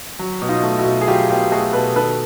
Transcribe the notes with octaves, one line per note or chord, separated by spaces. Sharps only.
F#3
B2
D#4 F4
A3
E4 F#4
B2
G#4
F#3 F4 G4
B2 F4 G4
A3 F#4 G#4
B2 A4 B4
D#3 A4 B4